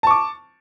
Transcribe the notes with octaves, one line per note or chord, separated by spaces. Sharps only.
A5 C#6 D6